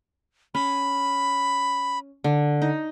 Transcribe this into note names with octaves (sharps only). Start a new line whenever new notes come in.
C#4 B5
D3
D#4